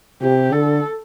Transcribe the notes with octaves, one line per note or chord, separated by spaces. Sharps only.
C3 G4
D3 A4